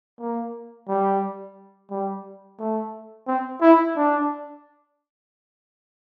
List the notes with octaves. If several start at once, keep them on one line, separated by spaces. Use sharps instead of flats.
A#3
G3
G3
A3
C4
E4
D4